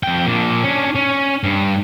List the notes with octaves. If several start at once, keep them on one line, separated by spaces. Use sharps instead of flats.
F2 G5
A#2 D4
C#4 D4
C#4
G2